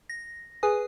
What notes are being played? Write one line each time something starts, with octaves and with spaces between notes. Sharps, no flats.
A#6
G#4 B4 G#5 D#6